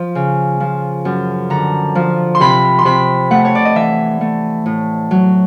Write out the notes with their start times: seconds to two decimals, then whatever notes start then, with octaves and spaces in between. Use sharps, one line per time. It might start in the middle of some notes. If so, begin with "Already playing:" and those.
Already playing: F3
0.15 C#3
0.60 F3
1.05 F#2
1.50 D3 A#5
1.95 F3
2.35 C6
2.40 C3 B5
2.79 C6
2.85 C3 B5
3.31 A3 F#5
3.45 C#5
3.55 D5
3.65 D#5
3.75 E3 E5
4.21 A3
4.66 A2
5.11 F#3